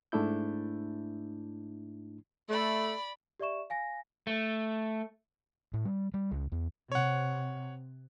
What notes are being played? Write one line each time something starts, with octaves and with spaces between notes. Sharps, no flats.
G#2 A3 D4 E4 G6
A3 D5 B5
G4 D5 E5 C#6 E7
F5 G#5 A#6
A3
A2
G3
G3
C#2
E2
C3 C#5 F#5